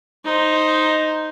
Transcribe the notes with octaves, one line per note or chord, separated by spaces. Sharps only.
D#4 C5